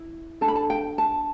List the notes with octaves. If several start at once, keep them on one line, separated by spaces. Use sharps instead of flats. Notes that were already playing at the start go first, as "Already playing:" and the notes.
Already playing: E4
D4 A4 A5
B5
A5
G5
A5